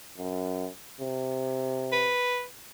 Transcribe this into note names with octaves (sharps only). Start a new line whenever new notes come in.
F#2
C3
B4